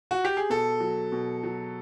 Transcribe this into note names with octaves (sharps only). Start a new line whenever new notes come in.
F#4
G4
G#4
B2 A4
F#3
B2
F#3